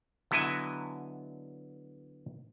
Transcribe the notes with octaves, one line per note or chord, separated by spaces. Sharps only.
D3 F#3 B3 E4 D#5 G#5